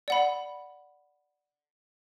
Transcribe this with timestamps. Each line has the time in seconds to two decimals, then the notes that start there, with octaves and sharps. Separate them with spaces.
0.08 D5 F#5 B5